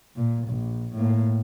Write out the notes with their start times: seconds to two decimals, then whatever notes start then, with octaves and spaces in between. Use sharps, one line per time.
0.16 A#2
0.48 A#1
0.94 A2 A#3